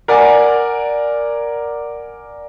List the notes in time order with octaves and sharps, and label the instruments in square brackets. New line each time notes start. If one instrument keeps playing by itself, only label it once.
[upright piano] A#4 D5 F#5 G#5